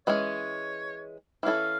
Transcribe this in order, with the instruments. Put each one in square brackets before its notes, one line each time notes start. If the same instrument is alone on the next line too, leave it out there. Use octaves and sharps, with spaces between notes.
[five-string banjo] E3 G#3 C#4 [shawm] C#5
[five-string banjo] E3 G#3 C#4 E4 A4 [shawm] F5